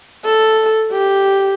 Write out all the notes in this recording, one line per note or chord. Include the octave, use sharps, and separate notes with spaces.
A4
G4